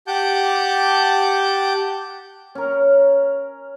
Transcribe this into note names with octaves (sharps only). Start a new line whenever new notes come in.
G4 F#5 A5 D6 G6
C#4 A#4